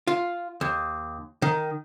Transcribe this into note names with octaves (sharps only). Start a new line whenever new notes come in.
F4
D#2
D#3